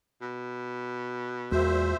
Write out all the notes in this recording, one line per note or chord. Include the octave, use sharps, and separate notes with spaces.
B2
E2 A#2 G#3 F#4 C5 E5